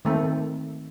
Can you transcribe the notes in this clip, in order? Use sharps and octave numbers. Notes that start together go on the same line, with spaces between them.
D#3 A3 C4